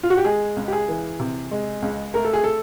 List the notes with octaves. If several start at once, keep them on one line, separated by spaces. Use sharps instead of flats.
F4
F#4
G4
G#3 G#4
C#2
G4
G#4
E3
C3
G#3
C#2
A3 A#4
A4
G#4
A4